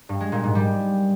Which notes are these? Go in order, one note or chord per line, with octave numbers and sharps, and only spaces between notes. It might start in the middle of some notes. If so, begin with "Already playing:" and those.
G2
G#3
A#2
G#2
G3